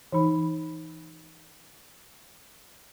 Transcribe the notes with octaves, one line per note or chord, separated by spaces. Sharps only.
E3 D#4 B5